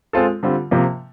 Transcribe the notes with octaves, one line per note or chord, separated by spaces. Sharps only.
G#3 C4 F4 A4
D3 G3 C4 F4
C3 F3 A#3